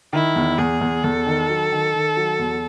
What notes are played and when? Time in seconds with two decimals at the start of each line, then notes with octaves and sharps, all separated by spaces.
0.13 D#3 E4
0.36 E2
0.58 E2 G#4
0.81 E2
1.04 E2 A4
1.26 D#3
1.50 F#3
1.72 D#3
1.94 D#3
2.17 F#3
2.39 E2